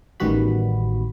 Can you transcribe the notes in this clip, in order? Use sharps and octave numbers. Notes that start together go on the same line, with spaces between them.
A1 D#3 G3 B3 F#4 B5